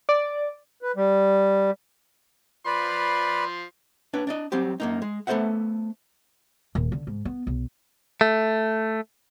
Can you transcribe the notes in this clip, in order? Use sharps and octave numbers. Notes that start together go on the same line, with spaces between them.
D5
B4
G3
F3 B4 D5 B5 C6
D4 B4 C#5
D4 D5 D#5
F#3 G3 C4 G4
F#2 A#3 D#4
G#3
A3 B3 A4 C5 E5 F#5
D#1
D3
G#2
B3
B1
A3